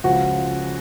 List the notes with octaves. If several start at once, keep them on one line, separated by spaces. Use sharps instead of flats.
C#2 C#3 F3 F#4